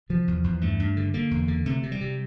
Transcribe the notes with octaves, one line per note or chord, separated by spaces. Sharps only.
C3 F3
E2
E2
G2 A3
G2
D3
D3 A#3
E2
D3
C3 A3
C3
G3
C3